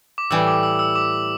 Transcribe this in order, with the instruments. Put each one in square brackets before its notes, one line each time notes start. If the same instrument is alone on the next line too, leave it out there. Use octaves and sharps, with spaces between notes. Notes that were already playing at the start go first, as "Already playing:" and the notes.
[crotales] D6
[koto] A2 E3 G3 [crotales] E6
[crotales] D6
E6
E6
D6